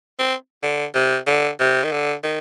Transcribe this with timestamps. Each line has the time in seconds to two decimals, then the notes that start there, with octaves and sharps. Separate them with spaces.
0.19 C4
0.63 D3
0.95 C3
1.27 D3
1.59 C3
1.84 D#3
1.91 D3
2.23 D#3